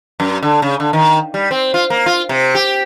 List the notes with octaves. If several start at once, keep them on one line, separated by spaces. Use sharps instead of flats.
F#2
D3
C#3
D3
D#3
G3
C4
F4
A#3
F4
C3
G4